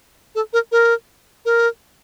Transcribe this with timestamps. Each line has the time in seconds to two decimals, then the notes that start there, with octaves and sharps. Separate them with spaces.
0.35 A4
0.53 A#4
0.72 A#4
1.45 A#4